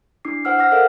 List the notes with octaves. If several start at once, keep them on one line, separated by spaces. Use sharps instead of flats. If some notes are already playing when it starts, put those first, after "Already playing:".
D4 E4 D6 C7
C5 F#5 E6 F6
C5 F#5 D6 F6 A#6
A4 A#4 C5 D#5 F5 F#5